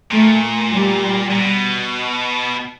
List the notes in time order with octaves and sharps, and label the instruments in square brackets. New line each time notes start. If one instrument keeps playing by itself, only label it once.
[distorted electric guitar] A#2 [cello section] A3
[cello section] G3
[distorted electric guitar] A#2
B2